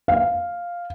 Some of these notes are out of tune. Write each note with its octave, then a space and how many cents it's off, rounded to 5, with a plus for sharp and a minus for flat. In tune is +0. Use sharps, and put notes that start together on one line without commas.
F5 +0